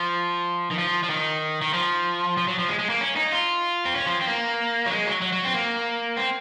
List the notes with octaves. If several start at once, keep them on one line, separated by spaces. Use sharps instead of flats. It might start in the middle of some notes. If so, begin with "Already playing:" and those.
Already playing: F3
D#3
F3
F3
D#3
D#3
F3
F3
F#3
F3
G#3
G#3
A#3
C#4
D#4
F4
C4
C#4
F3
C4
A#3
F#3
G#3
F#3
F#3
F#3
C4
A#3
C4